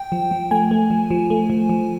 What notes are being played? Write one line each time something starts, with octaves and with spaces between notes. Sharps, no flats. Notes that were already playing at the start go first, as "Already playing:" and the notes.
Already playing: G5
F3
F3
A3 G#5
A3
F3
F3
A3
F3
F3